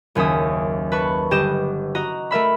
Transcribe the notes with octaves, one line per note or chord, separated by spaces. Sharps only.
F#1 D#2 C#4 E5 D#6
B4 A5 C#6
G1 G4 D#5 E7
F#4 D#5 A#5
A3 A#4 E5 B5